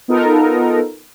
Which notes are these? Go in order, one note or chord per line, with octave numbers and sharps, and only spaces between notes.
B3 D#4 F4 A4 A#4